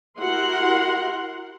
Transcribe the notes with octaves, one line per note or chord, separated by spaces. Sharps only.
E4 F#4 G4 A#4 F#5 C6